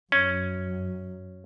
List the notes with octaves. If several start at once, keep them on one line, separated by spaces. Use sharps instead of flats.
F#2 C#4